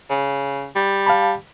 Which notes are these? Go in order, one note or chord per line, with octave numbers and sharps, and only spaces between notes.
C#3
G3
F5 A5 B5